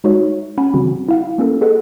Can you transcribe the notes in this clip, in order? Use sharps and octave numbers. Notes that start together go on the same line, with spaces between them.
G#3 D#4 F#4 B4 C#5 E5
C#4 F#5 G#5 A5 B5
C#3 E3 G3 C4 F#4
E4 F5 F#5
A#3 C#4 F4 A4 A#4
G#4 A4 B4 D#5 F#5